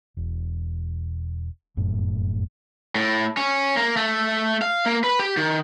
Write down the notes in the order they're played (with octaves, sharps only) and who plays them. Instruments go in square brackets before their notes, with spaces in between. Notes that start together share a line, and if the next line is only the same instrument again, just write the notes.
[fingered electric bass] E1
F1 F#2 A2
[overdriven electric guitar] A2
C#4
A#3
A3
F5
A#3
B4
G4
D#3